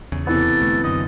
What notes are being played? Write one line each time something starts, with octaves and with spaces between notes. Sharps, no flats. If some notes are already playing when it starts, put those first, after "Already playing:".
E2 C#3
C3 E3 B3 A4
F1 D2 A3
F#2 D3 D#5